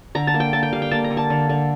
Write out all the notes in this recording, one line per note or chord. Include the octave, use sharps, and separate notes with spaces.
D3 A#5
A5
A#3
G5
A#3 A5
G5
G3 F5
G5
A#3 A5
A#5
D3
A5
D3
D3